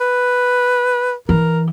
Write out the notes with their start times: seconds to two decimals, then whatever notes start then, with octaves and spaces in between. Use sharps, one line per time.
0.01 B4
1.29 E3 A#4